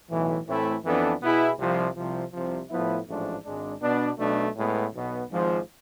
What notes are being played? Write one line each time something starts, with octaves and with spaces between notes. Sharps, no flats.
B1 A2 E3
A2 E3 A3 C4 E4
F2 E3 B3 D4 A4
B2 B3 E4 G#4
C2 C3 F3
C2 C3 F3
C2 C3 F3
A2 F3 B3 E4
A1 G#2 F3 A3 D4
G#1 G#2 G#3 D4
B2 B3 D4
B1 B2 A3 D4
A2 G#3 B3
B1 B2 B3
G#1 G#2 F3